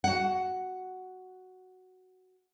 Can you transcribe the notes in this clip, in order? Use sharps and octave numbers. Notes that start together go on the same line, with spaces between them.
F#4 F#5